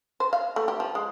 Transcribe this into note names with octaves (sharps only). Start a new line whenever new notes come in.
C5
F5
A3
G4
F3
G#3